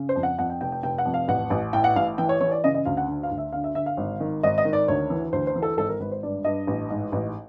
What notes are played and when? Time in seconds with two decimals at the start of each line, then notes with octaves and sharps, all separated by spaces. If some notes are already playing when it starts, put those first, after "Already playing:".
Already playing: C#3
0.09 C5
0.16 F2
0.23 F#5
0.38 F2 F#5
0.50 G5
0.61 F1 G5
0.72 G5
0.83 F1 G5
0.98 F#5
1.05 F2
1.14 F5
1.28 A1 F#5
1.50 A1
1.73 A2 G5
1.84 F#5
1.96 A1 F5
2.18 E3 G5
2.29 C#5
2.41 E3 C#5
2.51 D5
2.64 C#3 D#5
2.75 D#5
2.85 D2 F5
2.97 F#5
3.08 D3
3.23 F5
3.31 D2
3.38 E5
3.52 D3 F5
3.64 E5
3.75 D3 E5
3.86 F5
3.97 G#1
4.20 D#3
4.43 G#1 D#5
4.58 D#5
4.65 D#3
4.73 D5
4.88 D2 C#5
5.10 E3
5.33 D2 C5
5.47 C5
5.56 E3
5.62 A4
5.77 G#1 A4
5.89 A#4
6.00 G#1 B4
6.12 C5
6.23 G2 D5
6.44 G2 D#5
6.67 A1
6.90 G#2
7.12 A1